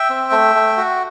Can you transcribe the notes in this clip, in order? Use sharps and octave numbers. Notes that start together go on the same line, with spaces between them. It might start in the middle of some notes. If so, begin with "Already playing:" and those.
Already playing: E5 G5
C4
A3
A3
F#4